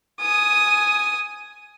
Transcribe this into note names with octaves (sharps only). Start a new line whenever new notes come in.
G#5 D#6